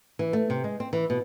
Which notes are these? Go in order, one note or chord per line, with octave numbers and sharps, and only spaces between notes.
E3
A3
C3
G#3
C4
E3
B2